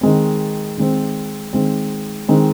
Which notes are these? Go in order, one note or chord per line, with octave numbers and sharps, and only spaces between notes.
D#3 G#3 C4
D#3 G#3 C4
D#3 G#3 C4
D#3 G#3 C4